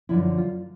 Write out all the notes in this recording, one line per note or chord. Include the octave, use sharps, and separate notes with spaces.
F#2 D3 F3 E4
F4